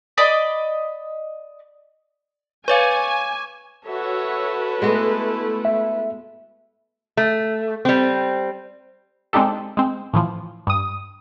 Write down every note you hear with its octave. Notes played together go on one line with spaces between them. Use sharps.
D5 D#5 B5 D6
B4 C#5 F5 G#5 C#6 D6
F#4 A4 B4 C#5 E5
G#3 A3 B3 E4 F#4
E5
A3
G3 C4
G#3 C4 D4 D#4 G4 A4
G#3 C4
A2 E3 F3
G2 D#6